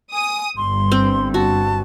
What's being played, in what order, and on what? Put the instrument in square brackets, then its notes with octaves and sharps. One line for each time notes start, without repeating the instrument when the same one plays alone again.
[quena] G#5 [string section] D#6
[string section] G1 G2 [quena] C6
[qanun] C4
[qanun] F#4 [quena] A5